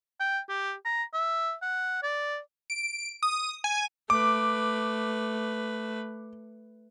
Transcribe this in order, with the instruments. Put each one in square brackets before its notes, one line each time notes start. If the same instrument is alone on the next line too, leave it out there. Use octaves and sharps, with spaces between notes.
[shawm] G5
G4
A#5
E5
F#5
D5
[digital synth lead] D7
D#6
G#5
[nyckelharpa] A3 B4 [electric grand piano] D6